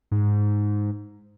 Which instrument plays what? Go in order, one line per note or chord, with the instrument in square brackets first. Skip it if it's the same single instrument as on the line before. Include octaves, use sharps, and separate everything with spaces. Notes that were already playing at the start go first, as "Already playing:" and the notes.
[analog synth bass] G#2